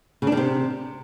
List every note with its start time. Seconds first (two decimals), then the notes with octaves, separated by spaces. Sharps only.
0.22 C#3
0.27 D4
0.32 D#3
0.37 C3